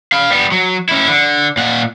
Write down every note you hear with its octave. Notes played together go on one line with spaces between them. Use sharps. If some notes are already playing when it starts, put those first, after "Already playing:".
F5 B5
G3 B3
F#3
C#4 E4
D3
A#2 F#5